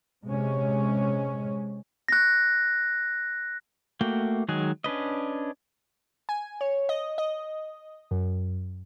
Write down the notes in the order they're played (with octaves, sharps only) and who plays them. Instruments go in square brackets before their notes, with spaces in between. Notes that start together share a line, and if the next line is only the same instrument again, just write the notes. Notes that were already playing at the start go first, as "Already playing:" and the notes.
[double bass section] C3 G#3 C#4
[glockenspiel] F#6 A#6
[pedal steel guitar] A3 A#3 F#4 G5
D#3 F#3 G#3 G#4 F#6
C#4 D4 B4 D#5
[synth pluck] G#5
C#5
D#5
D#5
F#2